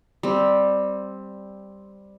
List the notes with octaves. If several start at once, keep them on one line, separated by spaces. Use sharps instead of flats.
G3 C4